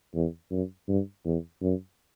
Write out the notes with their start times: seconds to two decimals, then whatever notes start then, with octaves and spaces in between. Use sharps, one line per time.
0.15 E2
0.51 F#2
0.88 G2
1.25 E2
1.62 F#2